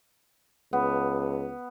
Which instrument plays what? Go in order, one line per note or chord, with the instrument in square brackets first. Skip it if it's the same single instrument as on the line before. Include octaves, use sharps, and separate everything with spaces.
[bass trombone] C#2 [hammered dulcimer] B3